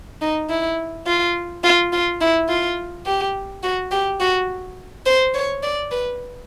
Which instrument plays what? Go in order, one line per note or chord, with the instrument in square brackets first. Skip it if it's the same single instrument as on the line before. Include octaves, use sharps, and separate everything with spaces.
[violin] D#4
E4
F4
F4
F4
E4
F4
G4
F#4
G4
F#4
C5
C#5
D5
B4